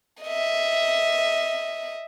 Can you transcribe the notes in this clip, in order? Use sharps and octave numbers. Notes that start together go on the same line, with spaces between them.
D#5 E5